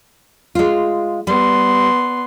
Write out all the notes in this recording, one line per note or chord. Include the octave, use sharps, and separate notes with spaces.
G#3 F4
G3 B3 C6